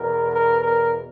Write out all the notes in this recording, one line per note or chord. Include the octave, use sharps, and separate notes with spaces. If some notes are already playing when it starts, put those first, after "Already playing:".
Already playing: E2 B2 A#4
A#4
A#4